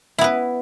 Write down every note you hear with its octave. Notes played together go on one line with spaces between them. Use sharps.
B3 E4 B4